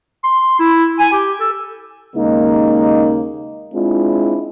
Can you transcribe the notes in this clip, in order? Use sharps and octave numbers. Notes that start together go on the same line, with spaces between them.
C6
E4
G#5
G4
A4
D#2 C#3 G#3 A#3 D#4
G#3 C4 D4 E4 F4